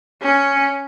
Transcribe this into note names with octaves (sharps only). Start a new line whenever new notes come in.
C#4